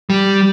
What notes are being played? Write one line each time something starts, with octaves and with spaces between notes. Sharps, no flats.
G3